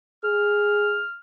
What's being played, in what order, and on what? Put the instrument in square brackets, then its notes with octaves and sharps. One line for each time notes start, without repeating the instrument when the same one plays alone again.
[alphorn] G#4 [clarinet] F6